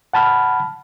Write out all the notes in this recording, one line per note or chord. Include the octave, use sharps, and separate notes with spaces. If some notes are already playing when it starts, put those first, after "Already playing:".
F#5 A5 B5 F6